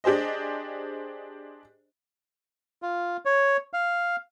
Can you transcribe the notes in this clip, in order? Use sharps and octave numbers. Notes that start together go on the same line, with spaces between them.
D4 G4 G#4 C5 D#5
F4
C#5
F5